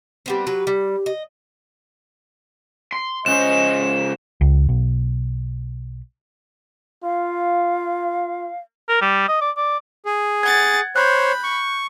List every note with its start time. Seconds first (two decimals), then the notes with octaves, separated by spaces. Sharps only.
0.26 G3 B3 C4
0.47 F#3 G4 B4
0.67 G3
1.06 D#5
2.92 C6
3.26 C#2 C#4 C5 D#5 E7
4.41 C#2
4.69 B1
7.04 F4 F5
8.89 A#4
9.01 G3
9.28 D#5
9.41 D5
9.57 D5
10.06 G#4
10.43 F#5 G#6 A6
10.96 C5 C#5 B5 F#6 G6
11.44 C#6